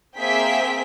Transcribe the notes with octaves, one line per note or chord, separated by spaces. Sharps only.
A#3 C4 G#4 E5 G5 B6